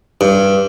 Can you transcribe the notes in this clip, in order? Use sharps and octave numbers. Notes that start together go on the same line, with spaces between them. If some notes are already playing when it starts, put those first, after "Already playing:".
G2